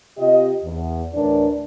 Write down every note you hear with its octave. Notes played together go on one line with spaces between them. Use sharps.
C3 F4 G4 D#5
E2
D2 A2 E3 D4 A#4 D5